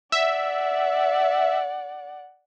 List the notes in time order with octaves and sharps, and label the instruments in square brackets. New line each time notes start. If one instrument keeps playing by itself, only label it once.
[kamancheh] D5 F#5 [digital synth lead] E5